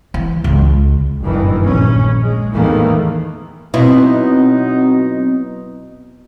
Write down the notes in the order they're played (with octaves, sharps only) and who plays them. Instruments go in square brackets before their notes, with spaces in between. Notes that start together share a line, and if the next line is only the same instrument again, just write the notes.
[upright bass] E3
C#2 G#3
[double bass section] F#1 G2 A#2 D#3 E3
A#1 C#4
G#3
E2 A2 D#3 E3 A3 A#3
[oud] B2 [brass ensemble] F#3 D#4 [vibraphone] C4 [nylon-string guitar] E4